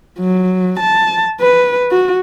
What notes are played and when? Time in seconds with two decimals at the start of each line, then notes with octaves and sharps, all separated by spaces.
0.18 F#3
0.80 A5
1.41 B4
1.91 F#4